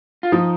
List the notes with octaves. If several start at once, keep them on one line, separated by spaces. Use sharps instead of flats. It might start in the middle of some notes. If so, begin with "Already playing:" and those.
F4
F3 D#4